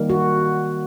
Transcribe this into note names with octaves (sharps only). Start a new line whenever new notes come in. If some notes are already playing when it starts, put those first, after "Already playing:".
Already playing: D#3 G3 A#3
F#4